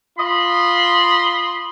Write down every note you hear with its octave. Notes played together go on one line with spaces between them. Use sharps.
F4 D#5 B5 C6